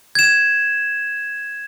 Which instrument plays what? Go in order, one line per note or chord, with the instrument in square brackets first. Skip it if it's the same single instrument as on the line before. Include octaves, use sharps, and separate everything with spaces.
[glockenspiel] G#6 E7